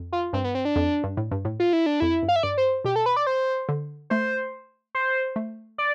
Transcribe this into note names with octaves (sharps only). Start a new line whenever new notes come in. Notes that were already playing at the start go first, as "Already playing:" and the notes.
Already playing: F2
F4
G2 C4
B3
C4
D4
F2
G2
A2
G2
A2
F4
E4
D4
F2 E4
G2
F5
E5
G2 D5
C5
B2 G4
A4
B4
D5
C5
D3
A3 C5
C5
A3
D5